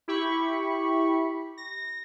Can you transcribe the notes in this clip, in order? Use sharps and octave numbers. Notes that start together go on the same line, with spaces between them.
E4 G4 B5 C#6
A#6